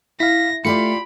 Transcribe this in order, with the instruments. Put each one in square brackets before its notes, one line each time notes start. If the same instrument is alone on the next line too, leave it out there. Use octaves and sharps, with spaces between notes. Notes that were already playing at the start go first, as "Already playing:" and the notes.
[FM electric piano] E4 [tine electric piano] F5 B6 [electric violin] A#6
[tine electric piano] A3 C#7 [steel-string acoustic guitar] F4 G4 D5 [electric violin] B5